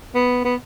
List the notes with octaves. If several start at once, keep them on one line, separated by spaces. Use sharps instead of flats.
B3
B3